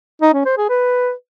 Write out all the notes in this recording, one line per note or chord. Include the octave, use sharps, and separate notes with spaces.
D#4
C#4
C5
G#4
B4